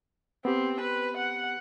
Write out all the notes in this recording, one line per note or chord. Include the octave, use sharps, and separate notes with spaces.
B3 C4 G4
B4
F#5